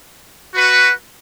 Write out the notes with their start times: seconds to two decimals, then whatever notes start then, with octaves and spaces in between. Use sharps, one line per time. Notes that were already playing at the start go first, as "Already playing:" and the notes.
0.54 F#4 B4